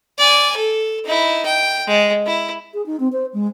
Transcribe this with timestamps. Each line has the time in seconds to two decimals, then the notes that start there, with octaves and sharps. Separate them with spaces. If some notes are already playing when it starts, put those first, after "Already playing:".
0.18 D5 G#5
0.57 A4
1.05 D#4 E4
1.46 G5
1.87 G#3
2.27 E4
2.74 G#4
2.86 D#4
3.00 C4
3.13 C5
3.33 G#3